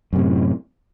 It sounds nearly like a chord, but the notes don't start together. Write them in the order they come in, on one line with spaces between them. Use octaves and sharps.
F#2 C3 A2